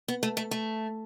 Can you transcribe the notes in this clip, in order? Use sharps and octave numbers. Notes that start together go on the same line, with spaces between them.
B3
A3
A3
A3